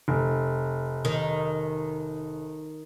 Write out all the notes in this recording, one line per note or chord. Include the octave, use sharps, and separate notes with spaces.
F1
D#3